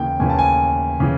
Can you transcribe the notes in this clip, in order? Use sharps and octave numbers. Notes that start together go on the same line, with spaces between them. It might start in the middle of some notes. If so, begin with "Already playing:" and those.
Already playing: D#2 C#3 E3 G5
D#2 C#3 E3 G#5
A5
G#5
C#3 E3